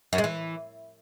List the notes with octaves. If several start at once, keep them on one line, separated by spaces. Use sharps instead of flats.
F#2
G#3
E3